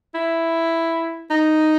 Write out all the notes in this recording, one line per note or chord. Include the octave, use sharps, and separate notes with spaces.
E4
D#4